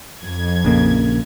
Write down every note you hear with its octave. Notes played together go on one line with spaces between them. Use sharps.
F2 G#6
A#1 C#3 A#3